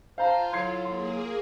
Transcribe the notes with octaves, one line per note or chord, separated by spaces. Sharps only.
F4 C5 F5 A5 A#5
D3 F#3 E4 C6 G#6 C7
A#3 G#4 C6